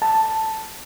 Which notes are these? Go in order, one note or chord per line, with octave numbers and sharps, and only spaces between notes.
A5